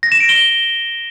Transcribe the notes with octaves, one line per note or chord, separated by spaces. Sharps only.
A#6
E7
D7
G7